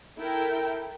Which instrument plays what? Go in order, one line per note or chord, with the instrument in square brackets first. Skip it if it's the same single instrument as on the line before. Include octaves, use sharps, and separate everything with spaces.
[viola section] E4 A4 A#4 G5